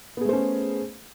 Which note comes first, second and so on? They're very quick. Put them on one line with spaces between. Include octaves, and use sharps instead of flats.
B3 G#4 A3 C5 C#4